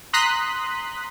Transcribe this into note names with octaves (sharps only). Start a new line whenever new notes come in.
A#5 C6 D#6 F#6 B6